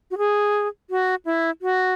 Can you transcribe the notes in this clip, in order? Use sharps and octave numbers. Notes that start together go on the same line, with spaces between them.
F#4
G#4
F#4
E4
F#4